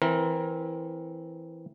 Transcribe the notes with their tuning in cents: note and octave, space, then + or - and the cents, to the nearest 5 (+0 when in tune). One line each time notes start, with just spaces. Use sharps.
E3 +0 C4 +0 A#4 +15